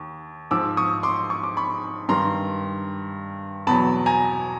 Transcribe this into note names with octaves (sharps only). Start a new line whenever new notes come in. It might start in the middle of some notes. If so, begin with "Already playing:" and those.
Already playing: D#2
G#2 F3 D6 E6
C#6 D#6
C6 D6
C#6
D6
B5 C#6
G2 D#3 G3 A#5 C6
E2 B2 F#3 A5 B5
G#5 A#5